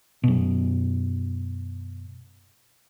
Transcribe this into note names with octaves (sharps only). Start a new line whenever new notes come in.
F#2 B2